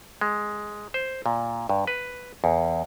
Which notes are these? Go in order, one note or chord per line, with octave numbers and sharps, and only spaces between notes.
G#3
C5
A#2
G2
B4
E2